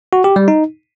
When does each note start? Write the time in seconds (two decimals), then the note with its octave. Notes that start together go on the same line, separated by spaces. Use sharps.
0.13 F#4
0.24 G4
0.36 G3
0.48 D#4